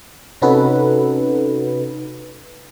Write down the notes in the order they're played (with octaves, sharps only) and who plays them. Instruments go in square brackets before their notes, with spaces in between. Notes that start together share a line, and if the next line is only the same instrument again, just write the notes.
[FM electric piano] C3 C#4 D#4 F#4 A4 B4